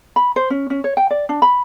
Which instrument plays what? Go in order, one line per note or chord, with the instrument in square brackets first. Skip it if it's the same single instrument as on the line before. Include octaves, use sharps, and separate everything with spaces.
[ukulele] B5
C5
C#4
C#4
C#5
G5
D5
D4
B5